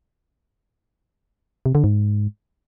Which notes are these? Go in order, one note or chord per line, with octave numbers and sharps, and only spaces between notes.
C3
D3
G#2